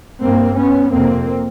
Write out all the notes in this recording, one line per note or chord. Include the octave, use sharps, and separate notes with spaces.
G2 A#3 C4
B3 C#4
F2 C3 A#3 C4